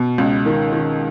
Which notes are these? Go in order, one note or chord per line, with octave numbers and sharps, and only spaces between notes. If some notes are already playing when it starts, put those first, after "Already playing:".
Already playing: B2
C#2
D#3
D#3